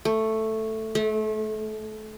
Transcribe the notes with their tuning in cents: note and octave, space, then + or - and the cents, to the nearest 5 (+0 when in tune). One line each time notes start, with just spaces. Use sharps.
A3 +5
A3 -30